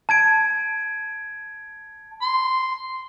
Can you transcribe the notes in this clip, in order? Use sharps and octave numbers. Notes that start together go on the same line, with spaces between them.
A5 G#6 D7
C6